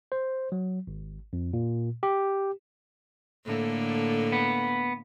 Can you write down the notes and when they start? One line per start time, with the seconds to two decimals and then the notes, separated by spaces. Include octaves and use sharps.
0.12 C5
0.52 F#3
0.87 G#1
1.33 F2
1.53 A#2
2.03 G4
3.46 A2 D3 A#3
4.32 B3